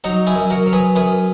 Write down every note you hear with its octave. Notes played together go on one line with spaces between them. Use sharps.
F#3 D#4 F#4
E4 G#4
F#2
F#4 A#4
F#3
G#4 B4
F#2 G#4 B4